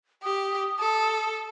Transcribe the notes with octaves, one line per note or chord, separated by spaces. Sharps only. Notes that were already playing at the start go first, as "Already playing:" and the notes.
G4 D#6
A4